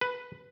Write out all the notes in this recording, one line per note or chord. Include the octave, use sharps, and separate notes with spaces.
B4